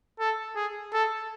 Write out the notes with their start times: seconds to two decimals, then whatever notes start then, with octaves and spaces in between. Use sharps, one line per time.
0.20 A4
0.56 G#4
0.93 A4